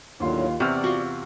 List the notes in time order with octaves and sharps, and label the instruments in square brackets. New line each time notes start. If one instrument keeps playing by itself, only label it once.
[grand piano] D#2 F4 C6 [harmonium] A2 D3 F#3
[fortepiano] E2 C4 [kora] C3 [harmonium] D5 F#5 [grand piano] C#6 F6
[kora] F4 F#4